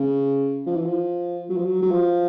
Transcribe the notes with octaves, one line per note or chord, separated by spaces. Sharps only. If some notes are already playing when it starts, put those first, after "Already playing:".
Already playing: C#3
F3
E3
F3
F#3
F3
F#3
F#3
F3